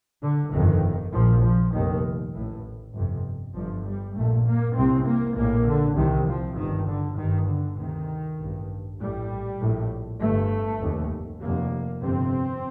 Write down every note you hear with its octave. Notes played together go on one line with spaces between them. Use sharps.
D3
G1 F2 C3 D#3
A#1 A#2 F3
F3
F1 D#2 D#3
A1 A2
G1 F2 C3
G1 G2 F3
G3
A#1 A#2 A3
A#3
C2 C3 C4
A#3
A#1 A2 A#3
D3
C2 C3 D#3
F3
G1 G2 D#3
D3
G1 G2 D#3
D3
D2 C3 D#3
A1 G2
A#1 A2 G3
A#1 A2
G1 G2 A3
F1 D#2
F1 D#2 A#3
G1 F2 C3 C4